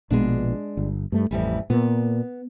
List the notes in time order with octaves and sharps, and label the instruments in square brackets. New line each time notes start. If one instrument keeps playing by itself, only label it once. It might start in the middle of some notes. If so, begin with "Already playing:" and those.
[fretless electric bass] A#1 B2 B3 [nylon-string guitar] G#3 D4
[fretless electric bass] G1
G2 A3
[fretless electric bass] A1 [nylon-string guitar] F2 E3 G3
[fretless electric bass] A#2 [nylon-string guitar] B3